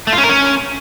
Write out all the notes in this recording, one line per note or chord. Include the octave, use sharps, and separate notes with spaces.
A3
F4
C#4
A#4
C#4